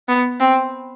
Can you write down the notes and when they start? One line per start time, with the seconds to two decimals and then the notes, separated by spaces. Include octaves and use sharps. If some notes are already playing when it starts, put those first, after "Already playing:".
0.08 B3
0.40 C4